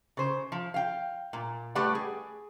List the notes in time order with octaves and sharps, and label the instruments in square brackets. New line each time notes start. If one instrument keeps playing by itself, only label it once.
[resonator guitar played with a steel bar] C#3 C5
F3
F5 G5
A#2
G3 A3 G4 B4 D5 F#5
G#4